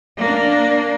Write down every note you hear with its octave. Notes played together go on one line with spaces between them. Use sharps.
A#3 D4